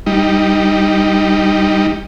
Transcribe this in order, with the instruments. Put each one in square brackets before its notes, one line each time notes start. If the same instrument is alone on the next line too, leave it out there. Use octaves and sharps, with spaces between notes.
[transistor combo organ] G3 D#4